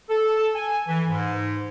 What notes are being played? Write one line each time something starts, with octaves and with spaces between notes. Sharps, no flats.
A4
G#5
E3
G#2